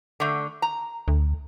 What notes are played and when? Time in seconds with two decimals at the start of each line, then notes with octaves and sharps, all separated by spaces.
0.20 D3 A3
0.62 A#5
1.08 D2